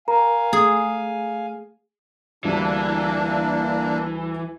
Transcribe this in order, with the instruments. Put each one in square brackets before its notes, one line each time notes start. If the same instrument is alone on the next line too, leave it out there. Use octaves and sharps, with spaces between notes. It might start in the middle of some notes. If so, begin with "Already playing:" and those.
[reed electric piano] A#4 [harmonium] F5 G#5 [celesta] A#5
[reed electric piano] A3 [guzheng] G#4
[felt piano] D2 G3 E4 [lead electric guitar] E3 [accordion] A#3 D4